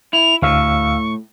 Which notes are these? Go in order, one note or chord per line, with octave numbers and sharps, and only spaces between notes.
E4 F7
D2 A2 F5 C#6 E6